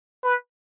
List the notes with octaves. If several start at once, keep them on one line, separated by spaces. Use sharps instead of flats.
B4